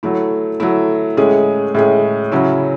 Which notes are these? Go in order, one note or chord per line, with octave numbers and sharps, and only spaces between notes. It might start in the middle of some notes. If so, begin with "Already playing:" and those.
F#3 A3 E4
F#3 A3 E4
A2 G#3 C#4 G#4
A2 G#3 C#4 G#4
C#3 F#3 C#4 E4